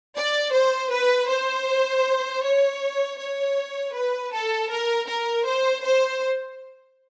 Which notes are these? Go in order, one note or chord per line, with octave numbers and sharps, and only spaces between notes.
D5
C5
B4
C5
C#5
C#5
B4
A4
A#4
A#4
C5
C5